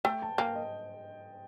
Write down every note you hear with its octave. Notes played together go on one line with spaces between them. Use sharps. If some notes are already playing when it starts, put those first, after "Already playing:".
A3 G5
A5
A#3 G5
D#5